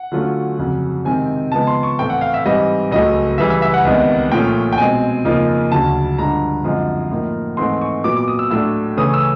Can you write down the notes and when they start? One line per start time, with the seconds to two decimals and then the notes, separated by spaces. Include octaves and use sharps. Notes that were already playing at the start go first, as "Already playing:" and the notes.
Already playing: F#5
0.12 D3 F#3 A3 C#4 F4
0.58 F2 C#3 F#3
1.05 C3 D#3 G#3 C4 G#5
1.52 C#3 F3 G#3 B3 A5
1.67 C6
1.83 C#6
1.99 A2 E3 A3 C4 G5
2.10 F#5
2.21 F5
2.34 E5
2.45 G#2 E3 G3 C4 D#5
2.91 C#2 C#3 F#3 A3 D#5
3.38 C#2 C#3 E3 G3 E5
3.50 E5
3.62 E5
3.74 F#5
3.85 C2 C3 D#3 G#3 B3
4.32 A#2 F3 A3 C#4 G5
4.73 G5
4.78 B2 G#3 C4 G#5
5.24 F2 C#3 F3 A#3 D#4
5.71 D2 C#3 F#3 A5
6.18 G2 D3 F3 G#3 A#5
6.64 F#2 D3 F3 G#3 C4
7.11 A2 F3 A#3 D#4
7.57 G#2 E3 A3 C4 C6
7.81 C#6
8.04 A#2 F#3 B3 D6
8.17 D6
8.28 D#6
8.39 E6
8.50 A2 F#3 A3 D4 E6
8.97 C#3 E3 A3 C#4 D#6
9.14 E6